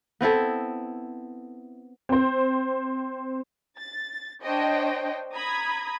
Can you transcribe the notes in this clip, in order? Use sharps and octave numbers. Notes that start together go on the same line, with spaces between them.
B3 C4 E4 A4
C4 C5
A6
D4 C5 C#5 D#5 G5
A#5 B5 D#6 G#6